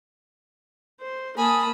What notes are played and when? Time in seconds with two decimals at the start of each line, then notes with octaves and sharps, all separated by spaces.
1.01 C5
1.37 A#3 G#5 A5 B5 D#6